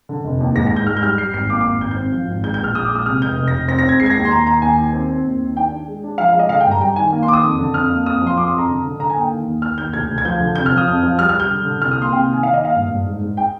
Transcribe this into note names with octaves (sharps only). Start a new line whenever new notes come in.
D3
F1
D#2
G#2 A#6
A#6
G#2 G6
G#2 F6
G6
G3 F6
G3 C7
G#1 C7
A#3 D6
D6
G#1
G#1 G6
G6
C4
F3
G#1
G#3 G6
G6
A#1
F6
A#1 D#6
D6
G#3
D#6
C3 F6
F1 G6
F1
A#6
F1
C4 A#6
A#6
C4
G#6
G#3 C7
G#6
A#6
D#2
C6
D#2 A#5
D#3 A#5
D#2 G#5
D#3
C4
C4
D#2
D#3
D4 G5
D4
G#3
D4
F3 F5
F5
G#3
D#5
D3 F5
G5
G2
A#5
G3 G5
D#3 G#5
A#3
C6
D#3 D6
D#6
F2
D3
F2 F6
A#3
F2 D#6
F3 C6
F2 D6
C6
F2
A#5
D3
D3
D3 A#5
G#5
A#3 G5
D#3
D#2
D#3 F6
D#2 G6
D2 G#6
D2
G#6
F3 G6
D3
C3 G6
F6
F3
D#6
F2
F3
G3 F6
F6
G3
G6
D3
D3
C2 F6
D#6
A#3
C6
C3 G5
D#3 G#5
D#3 F5
D#5
A#3
F5
G2
G2
G#2
G#2
G5